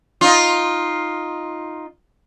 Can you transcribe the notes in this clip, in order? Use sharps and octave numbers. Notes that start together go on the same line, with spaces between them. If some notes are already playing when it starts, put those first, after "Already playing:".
D#4 F4